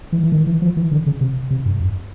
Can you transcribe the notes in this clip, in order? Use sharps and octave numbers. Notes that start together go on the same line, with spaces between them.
E3
E3
D#3
E3
F3
E3
D3
C#3
C3
C3
G2
F#2